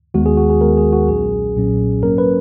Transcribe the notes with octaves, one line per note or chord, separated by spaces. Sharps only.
D#2 D#3 G#3 B3 F#4
G#4
F#4
G#4
D#2 D#3 G#3 B3 A#4
G#4
F#4
B1 A#2 F#3 C#4 G#4
B1 A#2 F#3 C#4
G#2 F#3 A#3 C#4 A#4
B4